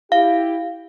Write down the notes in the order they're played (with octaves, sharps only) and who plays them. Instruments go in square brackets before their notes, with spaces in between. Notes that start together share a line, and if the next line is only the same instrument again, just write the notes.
[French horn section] E4 G4 [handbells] F5